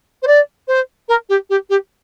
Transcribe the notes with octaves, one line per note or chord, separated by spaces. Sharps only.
C5
D5
C5
A#4
G4
G4
G4